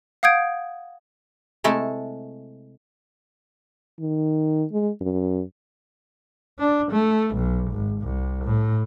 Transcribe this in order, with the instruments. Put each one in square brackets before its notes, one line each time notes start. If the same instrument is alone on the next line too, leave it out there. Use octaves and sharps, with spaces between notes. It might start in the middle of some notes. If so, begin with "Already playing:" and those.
[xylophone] F5 F#5 D#6 G6 G#6 D7
[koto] C3 G#3 A3 E4 A4
[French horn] D#3
G#3
F#2
[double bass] D4
A3
B1
G#1
C2
A2